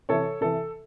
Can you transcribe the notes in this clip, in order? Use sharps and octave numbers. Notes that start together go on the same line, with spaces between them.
C3 E3 A4 C#5
C3 E3 A4